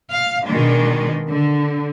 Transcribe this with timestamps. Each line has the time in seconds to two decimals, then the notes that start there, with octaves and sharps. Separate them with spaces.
0.11 F5
0.46 B2 D#3 G#3 D4
1.29 D3